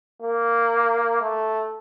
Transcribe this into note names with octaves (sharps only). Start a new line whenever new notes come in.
A#3
A3